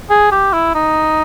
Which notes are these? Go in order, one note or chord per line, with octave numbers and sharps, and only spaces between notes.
G#4
G4
E4
D#4